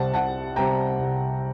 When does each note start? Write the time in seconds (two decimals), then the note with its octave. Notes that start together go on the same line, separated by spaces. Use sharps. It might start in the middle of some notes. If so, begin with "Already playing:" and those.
Already playing: C2 C3 G3 C4 F#5 A5
0.14 C2 F#5 A5
0.56 C3 G3 C4 G5 A#5
0.99 C2